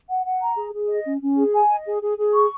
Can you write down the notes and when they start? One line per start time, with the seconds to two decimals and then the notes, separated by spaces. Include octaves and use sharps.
0.10 F#5
0.25 F#5
0.41 A#5
0.57 G#4
0.73 G#4
0.89 D#5
1.05 C#4
1.21 C#4
1.37 G#4
1.54 G#5
1.70 D#5
1.86 G#4
2.02 G#4
2.18 G#4
2.34 C#6